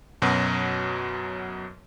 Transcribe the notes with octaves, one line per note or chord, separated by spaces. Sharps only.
F#2 B2 F#3